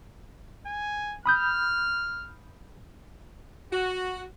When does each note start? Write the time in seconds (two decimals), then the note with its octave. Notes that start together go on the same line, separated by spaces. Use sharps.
0.66 G#5
1.26 B5 D#6 F6 G6
3.72 F#4